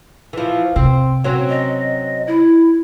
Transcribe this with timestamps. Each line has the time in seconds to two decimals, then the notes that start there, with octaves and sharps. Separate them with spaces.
0.33 E3 F3
0.76 C3 C4
1.24 F#3 C4 C#4
1.49 D#5
2.27 E4